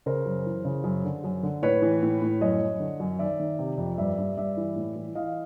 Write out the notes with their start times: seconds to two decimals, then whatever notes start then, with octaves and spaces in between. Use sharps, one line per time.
0.06 C#3 A#4 C5
0.26 F#2
0.46 E3
0.65 C#3
0.84 F#2
1.04 D3
1.24 F#2
1.43 D3
1.62 A2 B4 C#5
1.82 E3
2.03 A2
2.22 A2
2.41 F#2 C#5 D#5
2.61 F#2
2.80 D3
3.00 F#2
3.19 D#3 D5 E5
3.40 D#3
3.59 C3
3.78 F2
3.98 G2 D5 E5
4.18 G2
4.37 G2 D5 E5
4.57 E3
4.76 A2
4.96 E3
5.15 E3 D#5 F5